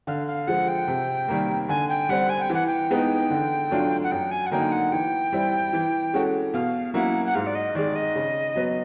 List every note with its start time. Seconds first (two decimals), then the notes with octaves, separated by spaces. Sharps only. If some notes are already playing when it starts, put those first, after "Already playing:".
0.07 D3 F5
0.27 F5
0.47 F3 G#3 F#5
0.68 G5
0.88 C3
1.28 D#3 G3 A#3
1.69 D3 G#5
1.89 G5
2.09 G3 C4 F#5
2.29 G#5
2.41 G5
2.50 E3 F#5
2.66 G5
2.90 G#3 B3 D#4
3.30 D3
3.71 F#3 A3 D4 F4
4.03 F#5
4.11 F#2 G5
4.31 G#5
4.46 F#5
4.52 D3 F#3 A#3 D#4 G5
4.72 F#5
4.92 E3 G5
5.32 G3 C4 E4
5.73 E3
6.13 G#3 C#4 F#4 A4
6.53 B2 F5
6.94 F#3 A#3 C#4 E4 F#5
7.26 F#5
7.35 G#2 F5
7.46 D5
7.55 D#5
7.75 D#3 G#3 D5
7.95 D#5
8.16 C#3
8.56 F#3 B3